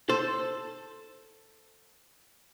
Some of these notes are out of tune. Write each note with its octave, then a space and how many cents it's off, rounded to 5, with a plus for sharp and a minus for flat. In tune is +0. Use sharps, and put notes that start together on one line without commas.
A4 +5 C5 +0